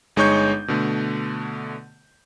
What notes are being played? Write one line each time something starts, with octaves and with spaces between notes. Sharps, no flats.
G1 G#3 D#4 C#5 C#6 G6
B2 D3 A3